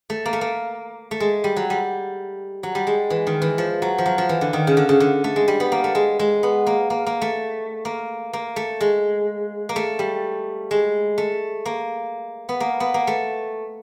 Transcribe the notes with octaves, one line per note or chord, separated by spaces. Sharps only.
A3
A#3
A3
A#3
A3
G#3
G3
F#3
G3
F#3
G3
G#3
E3
D#3
E3
F3
F#3
F3
F#3
F3
E3
D3
D#3
C#3
D3
C#3
D3
A3
G#3
G3
B3
A#3
A3
G#3
G#3
B3
A#3
A#3
A#3
A3
A#3
A#3
A3
G#3
A#3
A3
G3
G#3
A3
A#3
B3
A#3
B3
A#3
A3